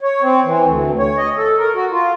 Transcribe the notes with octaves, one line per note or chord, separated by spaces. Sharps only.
C#5
C4
E3
D2
C#5
D#5
A4
A#4
F#4
F4